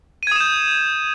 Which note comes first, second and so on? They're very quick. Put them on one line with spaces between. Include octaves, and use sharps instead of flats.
D#7 G#6 D#6 E7 G6